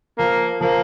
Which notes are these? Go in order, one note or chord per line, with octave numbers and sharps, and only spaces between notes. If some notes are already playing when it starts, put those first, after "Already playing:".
F3 A#3
F3 A#3